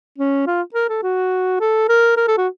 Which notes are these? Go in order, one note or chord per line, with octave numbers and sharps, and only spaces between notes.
C#4
F4
A#4
A4
F#4
A4
A#4
A#4
A4
F#4